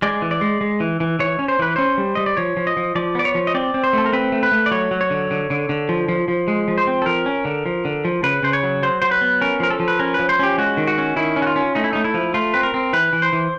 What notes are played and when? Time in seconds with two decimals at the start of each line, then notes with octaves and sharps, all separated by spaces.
0.02 G#3 D5
0.22 E3
0.31 D5
0.41 G#3
0.61 G#3
0.80 E3
1.00 E3
1.19 E3 C#5
1.39 C#4
1.48 C5
1.59 E3 B4
1.76 C#4 C5
1.98 G3
2.15 G3 D#5
2.26 D5
2.37 F3 C#5
2.57 F3
2.67 D#5
2.77 F3
2.95 F3 D5
3.15 B3 D5
3.25 C#5
3.35 F3
3.47 D#5
3.54 C4 D5
3.74 C4
3.84 C5
3.93 A3 A4
4.06 A#4
4.13 C4 B4
4.32 A3
4.43 B4
4.52 A3
4.66 D5
4.71 F#3 C#5
4.91 F#3
5.01 C#5
5.11 D3
5.31 D3
5.50 D3
5.69 D3
5.89 F3
6.09 F3
6.28 F3
6.48 G#3
6.68 F3
6.78 C5
6.87 C4
7.02 A4
7.06 F3 A#4
7.26 C#4
7.45 D3
7.66 F3
7.85 D3
8.05 F3
8.23 C#3 B4
8.43 C#3 C5
8.53 C#5
8.63 F#3
8.83 F#3 C5
9.02 F#3 C5
9.11 B4
9.21 B3
9.41 C#4 A#4
9.60 F3 A#4
9.70 A4
9.80 F3
9.88 B4
9.99 C#4 A#4
10.14 B4
10.19 F3
10.29 C5
10.39 C#4 G4
10.58 G#3 F#4
10.77 D#3
10.87 F#4
10.98 C#4
11.16 D#3 E4
11.36 C#4
11.42 F#4
11.47 F4
11.56 C#4
11.75 A3 D#4
11.84 E4
11.93 A3 D#4
12.04 E4
12.14 F3
12.34 A3 F4
12.54 C4 B4
12.63 A#4
12.74 C4
12.93 E3 B4
13.13 E3
13.22 C5
13.33 E3